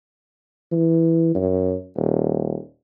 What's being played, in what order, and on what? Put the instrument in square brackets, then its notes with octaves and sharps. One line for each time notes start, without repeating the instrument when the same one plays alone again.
[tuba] E3
F#2
D#1